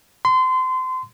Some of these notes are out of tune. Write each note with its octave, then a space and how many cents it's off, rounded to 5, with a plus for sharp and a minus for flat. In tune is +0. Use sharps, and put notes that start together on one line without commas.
C6 -30